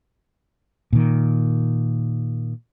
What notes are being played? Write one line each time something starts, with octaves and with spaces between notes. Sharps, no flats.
A#2 D#3